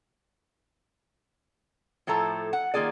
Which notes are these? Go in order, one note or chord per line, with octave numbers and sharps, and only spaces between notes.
A2 F3 A3 A4 A#5
F#5
D#3 A#3 F4 G#4 D5